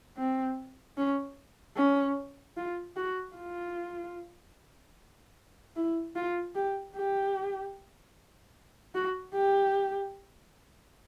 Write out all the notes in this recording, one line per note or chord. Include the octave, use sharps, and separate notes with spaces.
C4
C#4
C#4
F4
F#4
F4
E4
F4
G4
G4
F#4
G4